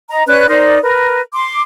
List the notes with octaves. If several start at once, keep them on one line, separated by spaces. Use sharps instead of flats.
D#5 A#5
C#4 B4 D5 F#6
D#4 A#4 C5 D5
A#4 B4
C6 D6